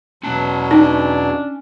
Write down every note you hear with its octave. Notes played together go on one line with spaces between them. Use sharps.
E2 B2 F#3 C#4 A5
D4 D#4